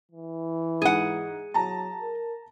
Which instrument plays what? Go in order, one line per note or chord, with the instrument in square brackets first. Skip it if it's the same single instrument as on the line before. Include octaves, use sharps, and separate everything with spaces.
[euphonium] E3
[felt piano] G#2 [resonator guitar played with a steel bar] G#4 F#5
[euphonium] F#3 [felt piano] A5 A#5
[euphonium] A#4